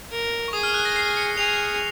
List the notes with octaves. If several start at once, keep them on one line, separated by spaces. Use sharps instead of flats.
A#4
C#6
G#4 D#6
F6
F#6
A#6
C7
C#7
G#4 F7